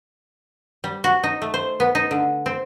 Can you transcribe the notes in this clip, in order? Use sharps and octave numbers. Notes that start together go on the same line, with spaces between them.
G3
F#4
D#4
A3
C5
B3
D#4
D3
C4